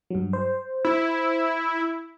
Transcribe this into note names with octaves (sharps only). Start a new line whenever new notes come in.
G2 F#3
C5
E4